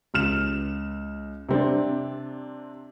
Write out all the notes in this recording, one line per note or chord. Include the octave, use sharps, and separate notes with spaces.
C#2 F6 E7
C3 C4 D4